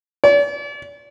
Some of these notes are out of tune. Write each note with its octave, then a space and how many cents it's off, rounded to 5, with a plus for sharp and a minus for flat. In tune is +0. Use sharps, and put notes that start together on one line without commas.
D5 -40